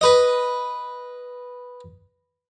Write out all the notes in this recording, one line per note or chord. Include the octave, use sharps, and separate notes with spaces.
B4 D#5